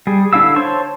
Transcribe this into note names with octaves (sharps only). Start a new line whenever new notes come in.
G3 G#4
D3 D4 E4 F5 E6
C5 C#5 A5 C6 C#6